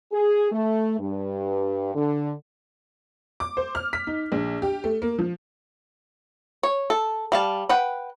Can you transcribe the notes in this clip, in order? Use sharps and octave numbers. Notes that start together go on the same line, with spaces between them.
G#4
A3
G2
D3
D6
C5
F6
B6
D#4
A#1
G4
A3
A#3
F3
C#5
A4
G3 F5 A5
B4 F#5 G5